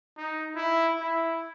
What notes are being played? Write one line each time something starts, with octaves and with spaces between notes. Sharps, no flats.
D#4
E4
E4